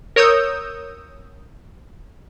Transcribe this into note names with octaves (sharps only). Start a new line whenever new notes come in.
A#4 C#5 D#6 E6 G6